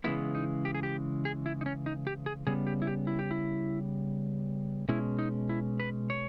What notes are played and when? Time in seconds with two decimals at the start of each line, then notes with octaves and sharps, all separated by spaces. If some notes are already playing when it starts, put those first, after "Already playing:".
0.04 C#3 E3 G#3 B3 E4
0.35 D#4
0.65 G4
0.75 G#4
0.83 G4
1.25 G#4
1.46 E4
1.61 D#4
1.66 C#4
1.86 D#4
2.07 G4
2.26 G#4
2.47 C#3 G3 B3 G#4
2.67 G4
2.82 E4
2.87 G4
3.07 E4
3.19 G4
3.31 E4
4.89 B2 G#3 C#4 E4
5.19 D#4
5.49 E4
5.80 B4
6.10 C#5